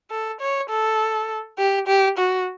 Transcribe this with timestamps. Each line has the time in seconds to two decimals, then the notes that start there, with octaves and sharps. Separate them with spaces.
0.10 A4
0.40 C#5
0.70 A4
1.58 G4
1.87 G4
2.18 F#4